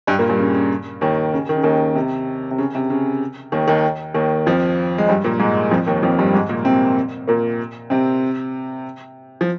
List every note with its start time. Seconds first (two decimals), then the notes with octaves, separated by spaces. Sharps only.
0.07 G2 G3
0.19 A#2 A#3
0.29 G2 G3
0.40 C#3
0.54 C#3
1.01 D#2 D#3
1.33 C#3
1.49 D#3
1.57 C#3
1.63 D#2 D#3
1.95 C3
2.51 C3
2.58 C#3
2.75 C3
2.90 C#3
3.52 D#2 D#3
3.68 D#2 D#3
4.14 D#2 D#3
4.46 F2 F3
4.98 G#3
5.09 G2 G3
5.24 A#2 A#3
5.40 G#2 G#3
5.71 F2 F3
5.87 D#2 D#3
6.03 F2 F3
6.19 G2 G3
6.34 G#2 G#3
6.49 A#2 A#3
6.65 C3 C4
7.27 A#2 A#3
7.90 C3 C4
9.41 F3